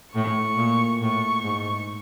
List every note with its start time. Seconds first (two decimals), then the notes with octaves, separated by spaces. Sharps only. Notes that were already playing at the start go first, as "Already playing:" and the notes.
0.14 A2 C#6
0.57 A#2
1.01 A2 C#6
1.44 G#2